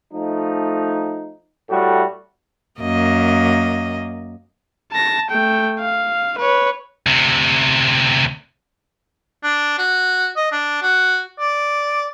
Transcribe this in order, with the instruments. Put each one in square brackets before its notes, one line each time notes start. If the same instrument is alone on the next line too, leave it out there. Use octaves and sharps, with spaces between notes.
[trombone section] F3 A3 D#4
A2 G3 A3 F#4
[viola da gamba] F#2 A#3 D#5
[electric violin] A5 A#6
A3 G5
F5
B4 C#5
[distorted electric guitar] D2 C3
[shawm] D4
F#4
D#5
D4
F#4
D5